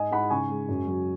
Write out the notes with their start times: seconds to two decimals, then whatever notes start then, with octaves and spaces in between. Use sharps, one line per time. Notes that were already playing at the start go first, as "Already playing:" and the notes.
Already playing: G#2 D#5 G#5
0.11 G#2 F#5 B5
0.30 C#3 G#5 C#6
0.49 G#3
0.68 F#2
0.87 F#3